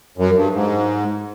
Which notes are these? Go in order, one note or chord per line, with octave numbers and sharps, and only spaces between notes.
F#2
G2
G#2